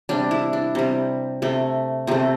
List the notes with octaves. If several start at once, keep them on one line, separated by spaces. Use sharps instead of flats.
C3 G3 D4
E4
D4
C3 G3
C3 A3
C3 A3 C4